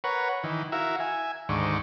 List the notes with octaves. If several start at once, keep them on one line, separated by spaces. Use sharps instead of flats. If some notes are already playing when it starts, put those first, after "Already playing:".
A#4 B4 C#5 F#5
D#3 E3
E4 F#4 A#4 E5 F5
E5 G#5
D2 G#2 D#3 D5 C#6